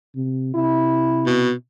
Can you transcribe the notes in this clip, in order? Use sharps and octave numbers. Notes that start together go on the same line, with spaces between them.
C3
C3 E4
B2